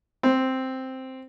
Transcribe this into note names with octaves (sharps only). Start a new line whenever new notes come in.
C4